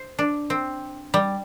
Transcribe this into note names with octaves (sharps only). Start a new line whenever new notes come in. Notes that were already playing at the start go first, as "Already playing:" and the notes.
Already playing: C5
D4
C4
G3